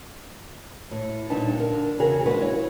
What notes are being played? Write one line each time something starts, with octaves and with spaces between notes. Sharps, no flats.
A2
A#2 D3 G3 D#4 B4 A5
D3 A#4
E2 C#3 F#4 G#4 A#4
F3 G#3 D4 F#4 B4
E4 C#5